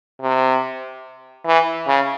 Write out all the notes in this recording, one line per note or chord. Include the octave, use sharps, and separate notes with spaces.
C3
E3
C#3